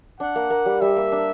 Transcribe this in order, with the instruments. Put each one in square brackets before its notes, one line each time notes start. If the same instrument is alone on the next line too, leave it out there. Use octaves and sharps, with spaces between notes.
[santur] D4 [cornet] F#5
[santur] A#3
A#3
G3
[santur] G3 [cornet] E5
[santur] A#3
D4